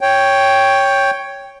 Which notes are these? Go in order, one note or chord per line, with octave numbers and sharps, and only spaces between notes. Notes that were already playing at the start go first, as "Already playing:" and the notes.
C#5 G5